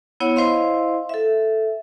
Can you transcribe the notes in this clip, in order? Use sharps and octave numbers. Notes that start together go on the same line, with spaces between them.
B3 E4 C#5 F#5
E4 C5 D#5 F5 C6
A4 E5